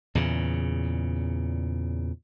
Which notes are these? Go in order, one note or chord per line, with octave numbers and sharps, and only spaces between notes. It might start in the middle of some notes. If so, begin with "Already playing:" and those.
E2 A#2 C#3